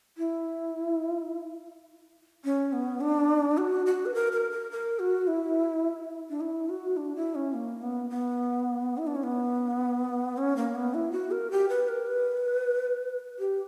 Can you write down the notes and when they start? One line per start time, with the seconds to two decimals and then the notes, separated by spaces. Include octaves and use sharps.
0.18 E4
2.44 C#4
2.73 B3
3.01 D4
3.58 F#4
3.86 F#4
4.06 B4
4.14 A#4
4.32 A#4
4.51 A#4
4.71 A#4
4.99 F#4
5.27 E4
6.30 D4
6.41 E4
6.69 F#4
6.97 D4
7.16 E4
7.35 C#4
7.54 A#3
7.82 B3
8.10 B3
8.98 E4
9.07 D4
9.15 C#4
9.23 B3
10.37 C#4
10.57 A#3
10.75 B3
10.94 E4
11.12 F#4
11.31 A#4
11.51 G4
11.69 B4
11.88 A#4
12.07 B4
13.39 G4